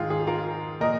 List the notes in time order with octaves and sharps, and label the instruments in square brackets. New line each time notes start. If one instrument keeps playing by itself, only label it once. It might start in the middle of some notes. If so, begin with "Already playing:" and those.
Already playing: [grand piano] G#2 D#3 F4 G#4
G#4
F4 A#4
A#2 F3 A#4 D#5